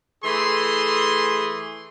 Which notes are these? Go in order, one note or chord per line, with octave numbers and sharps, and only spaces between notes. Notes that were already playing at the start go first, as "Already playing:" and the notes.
E3 A3 G#4 C6